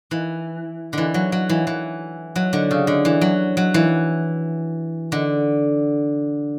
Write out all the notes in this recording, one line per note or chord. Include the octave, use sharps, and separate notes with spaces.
E3
D3 E3
F#3
F#3
E3
E3
F#3
D3
C#3
D3
E3
F#3
F#3
E3
D3